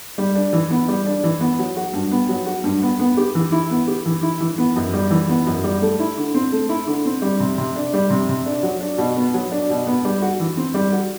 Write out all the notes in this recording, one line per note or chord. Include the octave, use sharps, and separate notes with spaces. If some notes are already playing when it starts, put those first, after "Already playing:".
G3
D4
E3
B3
G3
D4
E3
B3
F#3
F#4
G2
B3
F#3
F#4
G2
B3
B3
G4
E3
E4
B3
G4
E3
E4
E3
B3
F#2
G3
E3
B3
F#2
G3
A3
E4
D3
C4
A3
E4
D3
C4
G3
C3
C3
D4
G3
C3
C3
D4
F#3
D4
B2
B3
F#3
D4
B2
B3
G3
F#4
E3
C4
G3
F#4